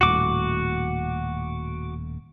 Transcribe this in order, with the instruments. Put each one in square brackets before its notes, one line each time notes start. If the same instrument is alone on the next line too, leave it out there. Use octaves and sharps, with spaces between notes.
[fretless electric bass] D#1 A2 [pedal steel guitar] F#4 D6